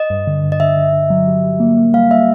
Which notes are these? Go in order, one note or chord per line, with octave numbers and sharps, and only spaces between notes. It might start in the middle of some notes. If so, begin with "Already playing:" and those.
Already playing: D#5
G2
D3
G2
D#5
D3 E5
D3
D3
F#3
G3
G3
A#3
A#3
G3 F5
G3 E5